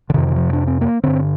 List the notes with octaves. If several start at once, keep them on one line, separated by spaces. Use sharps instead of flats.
D3
F2 C3 D#3
D#3
F3
D4
C4
A#3
G2 D3 C4